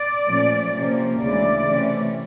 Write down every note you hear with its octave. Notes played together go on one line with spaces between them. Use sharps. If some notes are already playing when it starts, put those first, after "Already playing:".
Already playing: D5
A#2 F3 A3 C#4
C3 F3 A#3 C#4
D2 C#3 E3 G#3 D5
C3 E3 A3 C#4